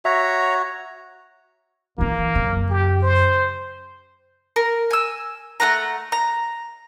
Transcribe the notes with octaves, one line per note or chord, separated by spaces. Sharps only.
F#4 C#5 E5 A#5
F#1 E3 A#3
F#2 C#3
G4
C5
A#4
G#5 E6
A3 C4 F#5 A#5
A#5